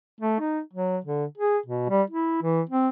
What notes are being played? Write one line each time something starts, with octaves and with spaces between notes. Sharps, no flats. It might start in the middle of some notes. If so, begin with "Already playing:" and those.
A3
D#4
F#3
D3
G#4
B2
G3
E4
E3
C4